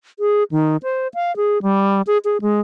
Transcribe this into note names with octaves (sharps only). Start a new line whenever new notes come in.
G#4
D#3
C5
F5
G#4
G3
G#4
G#4
G#3